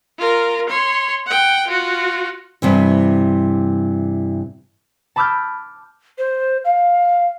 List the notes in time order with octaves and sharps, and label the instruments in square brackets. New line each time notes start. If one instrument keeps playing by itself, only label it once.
[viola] F4 A#4
C#5 C6
F#5 G5
F4 F#4
[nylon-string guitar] G2 C3 E3
[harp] A5 B5 D6 E6 F6 G6
[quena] C5
F5